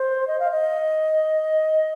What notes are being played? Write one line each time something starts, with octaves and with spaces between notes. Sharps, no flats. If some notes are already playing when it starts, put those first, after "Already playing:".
Already playing: C5
D#5
F5
D#5